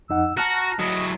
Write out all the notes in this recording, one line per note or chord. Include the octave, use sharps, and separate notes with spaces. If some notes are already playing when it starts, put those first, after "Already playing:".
F2 D#4 F#5 E6
F#4 A5 A#5 F6 F#6
F#3 E4 D#5